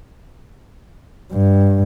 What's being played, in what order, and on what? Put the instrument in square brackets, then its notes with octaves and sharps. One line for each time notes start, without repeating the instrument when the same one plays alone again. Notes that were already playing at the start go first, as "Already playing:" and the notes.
[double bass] G2